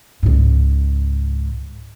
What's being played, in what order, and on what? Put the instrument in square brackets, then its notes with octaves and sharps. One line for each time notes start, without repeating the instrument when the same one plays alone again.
[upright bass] C#2 G#2